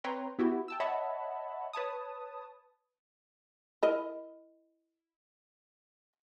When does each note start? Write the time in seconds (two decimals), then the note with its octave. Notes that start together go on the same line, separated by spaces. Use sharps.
0.04 C4 B4 C#5 G5 A#5 C6
0.39 B3 E4 F#4 G4
0.68 G5 A5 E6
0.80 C#5 D#5 E5 F#5 A5 B5
1.73 B4 C#5 A5 D#6
3.83 E4 A#4 D#5